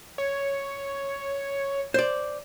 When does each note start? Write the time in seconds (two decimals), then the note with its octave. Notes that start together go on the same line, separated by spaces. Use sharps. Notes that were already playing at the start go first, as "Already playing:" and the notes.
0.18 C#5
1.94 C5 D5